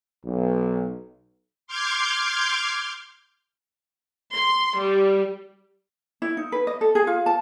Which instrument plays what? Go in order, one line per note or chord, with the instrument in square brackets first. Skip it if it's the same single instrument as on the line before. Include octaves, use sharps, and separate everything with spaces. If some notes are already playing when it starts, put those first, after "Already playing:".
[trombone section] B1
[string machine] C6 D6 F6 G6 G#6
[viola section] C6
G3
[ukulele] E4
D#4
B4
D#5
A4
G#4
F4
A5